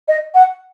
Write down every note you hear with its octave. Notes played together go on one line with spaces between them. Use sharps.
D#5
F#5